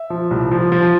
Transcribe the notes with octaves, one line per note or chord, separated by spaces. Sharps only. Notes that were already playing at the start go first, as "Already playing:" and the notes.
Already playing: E5
F3
C2
F3
F3